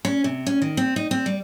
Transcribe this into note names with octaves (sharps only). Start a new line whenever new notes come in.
C#4
C3
C#4
D#3
C4
D#4
C4
G3